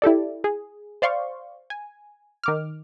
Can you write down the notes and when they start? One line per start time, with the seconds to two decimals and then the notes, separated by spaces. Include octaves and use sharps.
0.02 E4 G4 A4 D5
0.44 G#4
1.02 C5 D5 F5 C6 C#6
1.70 G#5
2.44 D#3 D6 F6